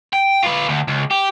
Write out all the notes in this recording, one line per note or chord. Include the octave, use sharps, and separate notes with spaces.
G5
F4 B4
D2
C#2
G4